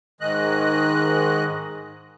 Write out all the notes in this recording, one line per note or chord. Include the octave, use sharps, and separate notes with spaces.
G#2 D#3 G#3 D#5 F#6